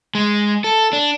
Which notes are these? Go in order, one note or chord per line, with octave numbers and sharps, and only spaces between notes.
G#3
A4
D4